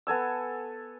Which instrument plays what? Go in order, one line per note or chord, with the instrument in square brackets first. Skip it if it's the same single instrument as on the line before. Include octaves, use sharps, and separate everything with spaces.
[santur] B3 A4 G#5 E6